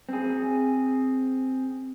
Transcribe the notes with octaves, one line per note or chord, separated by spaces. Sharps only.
C4 G#4